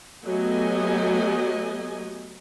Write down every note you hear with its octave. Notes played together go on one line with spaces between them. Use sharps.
F#3 A3 B3 G4 D#5 G#5